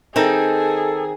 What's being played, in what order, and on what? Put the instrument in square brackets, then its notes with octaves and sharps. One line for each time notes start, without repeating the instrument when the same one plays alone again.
[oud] D#3 [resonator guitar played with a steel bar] C4 D#4 [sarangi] G#4 [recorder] A4